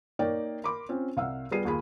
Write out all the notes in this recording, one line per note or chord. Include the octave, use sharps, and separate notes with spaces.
A#3 D#4 A#4 C#5 D5 G5
A#4 B5 C6 D6
C4 C#4 F4
C2 F5 F#5 E6
G3 B3 F4 G#4 C7 D#7
D#2 F4 G#4 B5